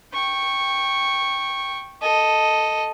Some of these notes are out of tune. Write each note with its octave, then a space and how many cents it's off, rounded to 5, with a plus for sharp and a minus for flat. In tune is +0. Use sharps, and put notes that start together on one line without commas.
G5 +0 C#6 -15
A4 +0 D#5 +5